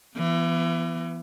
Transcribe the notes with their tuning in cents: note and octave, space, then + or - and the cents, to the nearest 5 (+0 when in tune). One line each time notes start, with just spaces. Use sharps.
E3 +35 B3 +0